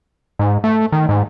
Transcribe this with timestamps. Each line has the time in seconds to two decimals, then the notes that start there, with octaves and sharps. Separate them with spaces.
0.39 G#2
0.64 A3
0.92 D#3
1.09 G#2